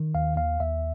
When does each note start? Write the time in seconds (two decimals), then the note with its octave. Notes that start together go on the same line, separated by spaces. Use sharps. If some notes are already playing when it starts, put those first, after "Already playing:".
Already playing: D#3
0.15 D#2 F5
0.37 D#2 F5
0.60 D#2 E5